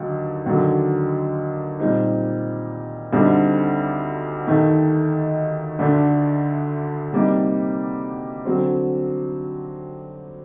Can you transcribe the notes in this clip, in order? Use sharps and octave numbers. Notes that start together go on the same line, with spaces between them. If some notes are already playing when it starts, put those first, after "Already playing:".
Already playing: D#2 D3 F#3
D#2 D3 F#3
A#2 G3 C4 D#4
D2 D3 G3 C4 D#4
D#2 D#3 A3 D#4
D2 D3 A3 D4
C3 G3 A#3 D#4
D3 F#3 C4